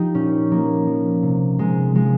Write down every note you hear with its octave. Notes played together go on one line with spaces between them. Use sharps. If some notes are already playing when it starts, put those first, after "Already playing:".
Already playing: F3 D#4 G4
A#2 C#4
F3 A#3
F3
C3
C3 G#3
F3 G#3